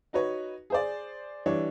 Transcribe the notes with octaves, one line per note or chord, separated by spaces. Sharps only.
D#4 F#4 B4 C#5
G#4 C5 D5
E3 G3 D4 C#5